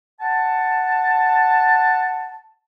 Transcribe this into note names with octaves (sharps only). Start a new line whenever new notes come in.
F#5 A5